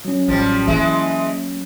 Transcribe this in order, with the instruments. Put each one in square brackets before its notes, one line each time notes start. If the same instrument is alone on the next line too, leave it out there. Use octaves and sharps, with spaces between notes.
[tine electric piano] F#3 C#4
[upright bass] A1 [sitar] F3 G3
[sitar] E3 G#3 [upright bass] A#3